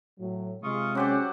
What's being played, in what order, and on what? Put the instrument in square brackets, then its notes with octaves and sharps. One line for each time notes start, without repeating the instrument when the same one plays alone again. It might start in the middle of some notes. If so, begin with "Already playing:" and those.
[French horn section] A2 F#3
[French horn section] C3 G#3 [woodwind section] F4 C#6 D#6
[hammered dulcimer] F#3 G4 D5 [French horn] C#4 [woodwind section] C5 F#5